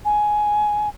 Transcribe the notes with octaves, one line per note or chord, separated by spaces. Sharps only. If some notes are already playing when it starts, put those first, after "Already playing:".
G#5